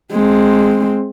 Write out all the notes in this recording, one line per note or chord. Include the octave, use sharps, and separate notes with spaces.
G#3 C4